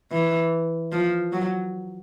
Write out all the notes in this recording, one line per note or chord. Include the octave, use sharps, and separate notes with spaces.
E3
F3
F#3